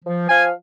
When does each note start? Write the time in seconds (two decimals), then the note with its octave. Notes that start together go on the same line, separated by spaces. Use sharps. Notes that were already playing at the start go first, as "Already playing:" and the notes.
0.05 F3
0.29 F3 F5 G#5